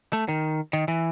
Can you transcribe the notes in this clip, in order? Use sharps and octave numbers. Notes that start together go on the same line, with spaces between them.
A3
D#3
D#3
E3